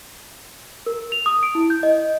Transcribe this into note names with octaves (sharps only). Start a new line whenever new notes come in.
A#4
F7
D#6
D7
E4
G6
D#5